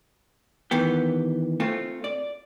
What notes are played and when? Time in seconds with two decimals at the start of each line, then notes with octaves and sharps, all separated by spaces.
0.71 D#3 E3 B3 G4
1.60 A3 C4 F4
2.04 D5